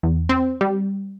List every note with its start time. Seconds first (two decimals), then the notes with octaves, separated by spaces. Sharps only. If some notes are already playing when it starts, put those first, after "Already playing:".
0.03 E2
0.29 C4
0.61 G3